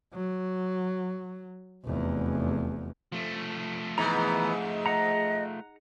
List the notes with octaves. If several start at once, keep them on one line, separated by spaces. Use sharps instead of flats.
F#3
F1 E2
F3 A3
G#2 E3 B3 A#5
D#5 F#5 A#5